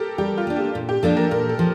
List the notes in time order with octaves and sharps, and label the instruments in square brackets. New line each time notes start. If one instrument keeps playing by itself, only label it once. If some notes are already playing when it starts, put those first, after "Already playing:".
Already playing: [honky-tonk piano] G4 A4 A#4
[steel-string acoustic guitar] G3 [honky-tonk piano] G4
[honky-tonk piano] F4
[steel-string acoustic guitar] A#3 D4
[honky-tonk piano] G4
[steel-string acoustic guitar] A#2
[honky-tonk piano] G4
[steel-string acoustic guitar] F3 A#3 D4 [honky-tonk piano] A4
[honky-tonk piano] A#4
[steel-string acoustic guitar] A#2 [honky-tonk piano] A#4
[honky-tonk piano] A4
[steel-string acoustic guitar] F3